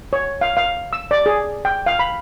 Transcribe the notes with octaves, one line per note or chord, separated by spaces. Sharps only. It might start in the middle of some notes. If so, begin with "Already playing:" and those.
C#5
F5
F5
E6
D5
G#4
G5
F5
B5